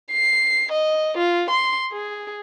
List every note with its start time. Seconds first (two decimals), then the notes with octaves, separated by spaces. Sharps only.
0.13 C7
0.72 D#5
1.17 F4
1.50 C6
1.92 G#4